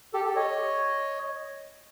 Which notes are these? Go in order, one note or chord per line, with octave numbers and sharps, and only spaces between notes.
G4 A4
G4 A4
C#5 D#5